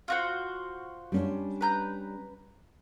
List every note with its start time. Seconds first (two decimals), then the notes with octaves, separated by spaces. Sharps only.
0.08 F4 F#4 C5
1.12 G3 C#4 D4
1.61 B4 A#5 G6